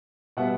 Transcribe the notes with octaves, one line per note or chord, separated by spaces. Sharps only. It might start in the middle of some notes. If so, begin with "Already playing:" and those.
B2 G3 B3 E5 F#5